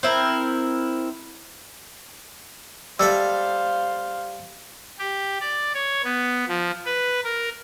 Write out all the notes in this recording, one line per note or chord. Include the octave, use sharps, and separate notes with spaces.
C4 E4 A#4
G3 A4 C5 E5 F5 E6
G4
D5
C#5
B3
F3
B4
A#4